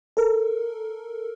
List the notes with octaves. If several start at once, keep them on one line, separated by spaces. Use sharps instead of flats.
A4 A#4